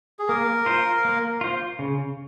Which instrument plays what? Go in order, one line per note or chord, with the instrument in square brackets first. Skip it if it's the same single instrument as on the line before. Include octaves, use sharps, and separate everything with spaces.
[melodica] G#4
[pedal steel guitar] A#3 [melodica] A#4
[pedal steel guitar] F4 C5
A#3
F4 C5
C#3